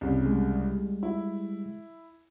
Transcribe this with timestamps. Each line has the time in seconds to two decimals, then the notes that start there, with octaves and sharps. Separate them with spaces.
0.01 C2 C#3
0.26 G3 G#3
1.03 E4